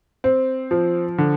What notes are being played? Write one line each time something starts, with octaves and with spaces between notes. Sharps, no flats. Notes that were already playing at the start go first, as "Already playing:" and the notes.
C4
F3
D3